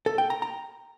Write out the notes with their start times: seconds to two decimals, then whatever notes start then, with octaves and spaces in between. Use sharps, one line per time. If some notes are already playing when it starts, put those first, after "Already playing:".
0.06 A4
0.18 G5
0.30 A#5
0.42 A#5